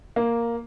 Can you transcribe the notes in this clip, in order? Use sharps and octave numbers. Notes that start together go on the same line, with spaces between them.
A#3